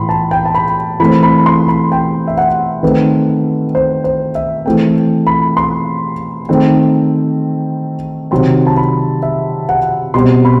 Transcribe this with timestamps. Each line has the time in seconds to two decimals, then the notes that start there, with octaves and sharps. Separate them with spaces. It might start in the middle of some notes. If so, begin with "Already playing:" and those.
Already playing: A2 E3 B5 C6
0.09 A5
0.31 G5
0.45 A5
0.55 B5
1.00 E3 A3 C4 B5
1.23 B5
1.46 C6
1.68 B5
1.92 G5
2.27 E5
2.38 F#5
2.83 D#3 A3 C4 B4
3.75 C5
4.04 C5
4.35 E5
4.66 E3 A3 C4 G5
5.27 B5
5.57 C6
6.49 D#3 A3 C4
8.31 C3 D#3 F#3 C4 C6
8.67 A5
8.77 B5
9.23 E5
9.69 F#5
10.14 B2 G3 C4 C6
10.45 B5